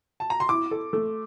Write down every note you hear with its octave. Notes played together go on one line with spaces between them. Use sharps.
A5
A#5
C6
E4 D6
A4
A3